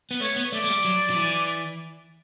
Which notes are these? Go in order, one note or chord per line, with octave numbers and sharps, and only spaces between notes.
B3
A3 C#5
B3
A3 D5
A3
G3
F#3
F#3
E3